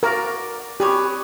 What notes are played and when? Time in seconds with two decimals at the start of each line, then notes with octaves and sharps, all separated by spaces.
0.03 F#4 A#4 D5 F5
0.80 G4 G#4 B4 C#5